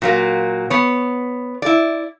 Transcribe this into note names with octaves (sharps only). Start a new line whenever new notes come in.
A#2 F#3 A#3
B3 C#5
E4 D5